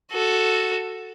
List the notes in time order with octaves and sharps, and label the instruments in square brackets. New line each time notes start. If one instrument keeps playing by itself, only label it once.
[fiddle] F#4 A4